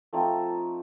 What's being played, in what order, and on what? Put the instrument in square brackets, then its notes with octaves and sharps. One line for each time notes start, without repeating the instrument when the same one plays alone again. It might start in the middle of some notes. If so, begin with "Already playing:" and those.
[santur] F3 A3 C4 D#4 A4